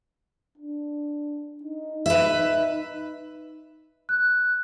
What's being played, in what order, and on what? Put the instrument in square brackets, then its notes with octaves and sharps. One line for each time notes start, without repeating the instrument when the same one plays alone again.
[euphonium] D4
D#4
[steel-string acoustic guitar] B4 E5
[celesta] F#6